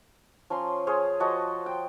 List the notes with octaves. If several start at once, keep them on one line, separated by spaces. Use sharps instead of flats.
F3 C#4 A#5 C6
G#4 C5 C#5 F5
F3 F#4 D#5 A5
G5